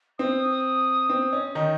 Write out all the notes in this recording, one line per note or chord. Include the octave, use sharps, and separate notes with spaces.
C4 D#6
C4
C#4
D#3 D#4